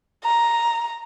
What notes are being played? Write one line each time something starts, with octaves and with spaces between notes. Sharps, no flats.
A#5